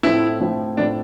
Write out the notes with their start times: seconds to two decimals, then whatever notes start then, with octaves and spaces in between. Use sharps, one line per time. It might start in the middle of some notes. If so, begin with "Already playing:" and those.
0.03 A2 F3 A3 C4 E4
0.41 A2 F3 A3 C4
0.77 A2 F3 A3 C4 D4